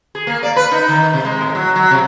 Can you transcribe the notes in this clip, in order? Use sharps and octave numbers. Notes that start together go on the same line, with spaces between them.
G#4
A#3
D5
B4
D#4
D#3
C3
G#3
A2
F#3
F#3
C3